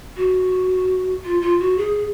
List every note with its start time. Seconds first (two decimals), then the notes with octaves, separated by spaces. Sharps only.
0.16 F#4
1.24 F4
1.41 F4
1.60 F#4
1.78 G#4